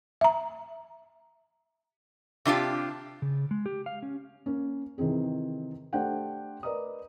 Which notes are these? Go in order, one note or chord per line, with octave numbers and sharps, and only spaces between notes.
E5 A#5
C3 D4 F4 G4
C#3
G#3
G4
F5
C#4
A#3 C#4
C3 D#3 E3 C4 G#4
A3 D4 G4 C5 F#5 G5
A#4 B4 D5 D#5 A#5 D#6